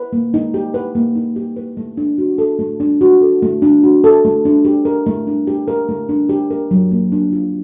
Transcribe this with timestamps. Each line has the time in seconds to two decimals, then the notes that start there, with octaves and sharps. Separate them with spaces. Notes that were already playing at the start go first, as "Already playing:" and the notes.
Already playing: B4
0.13 A#3
0.34 D#4
0.54 G4
0.74 B4
0.95 A#3
1.16 D#4
1.36 G4
1.57 B4
1.77 A3
1.97 D4
2.18 F#4
2.38 A4
2.59 A3
2.80 D4
3.01 F#4
3.21 A4
3.42 A3
3.62 D4
3.83 F#4
4.04 A4
4.25 A3
4.45 D4
4.65 G4
4.85 A#4
5.06 A3
5.27 D4
5.47 G4
5.68 A#4
5.89 A3
6.09 D4
6.29 G4
6.51 A#4
6.71 F#3
6.91 A#3
7.12 D4
7.33 F4